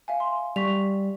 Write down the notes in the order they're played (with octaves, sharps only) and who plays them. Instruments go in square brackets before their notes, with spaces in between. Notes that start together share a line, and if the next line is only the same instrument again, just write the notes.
[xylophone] E5 F5 G#5
C6
[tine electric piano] G3 [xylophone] C#6 B6 F7